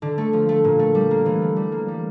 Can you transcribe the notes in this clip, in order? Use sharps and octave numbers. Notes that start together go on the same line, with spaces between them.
D3
A3
F3
A3
A#2
A3
G3
A#3
E3
A3
G3
A#3
G3